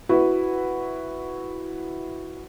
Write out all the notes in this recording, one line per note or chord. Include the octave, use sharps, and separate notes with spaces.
E4 F#4 B4